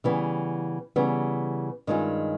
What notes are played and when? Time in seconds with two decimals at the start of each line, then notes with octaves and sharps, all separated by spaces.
0.04 C#3 E3 G3 B3
0.96 C#3 E3 G3 B3
1.87 G2 D#3 G#3 C#4 F4